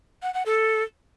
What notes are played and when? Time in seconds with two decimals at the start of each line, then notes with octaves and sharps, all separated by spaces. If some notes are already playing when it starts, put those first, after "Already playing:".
0.23 F#5
0.34 F#5
0.46 A4